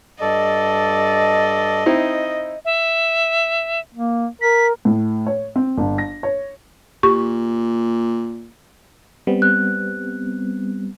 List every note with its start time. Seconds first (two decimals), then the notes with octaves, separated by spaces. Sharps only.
0.21 G2 A4 D5 D#5
1.86 C4 D#4 E4
2.65 E5
3.95 A#3
4.41 A#4 B6
4.85 A2
5.27 C#5
5.56 C4
5.78 G1
5.98 A#6
6.23 C#5
7.03 A#2 G4 C#6
9.27 G3 B3 C4
9.42 F#6